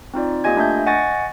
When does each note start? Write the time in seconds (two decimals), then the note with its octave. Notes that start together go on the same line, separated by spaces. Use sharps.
0.14 C4 D#4 F4 D5
0.44 A#3 F4 G4 D#5 G#5 G#6
0.56 A3 D4 E5 G#5 G6
0.86 D#5 F#5 G#5 C#6 A6 A#6